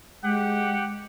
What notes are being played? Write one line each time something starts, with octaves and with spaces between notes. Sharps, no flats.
G#3 G4 F#5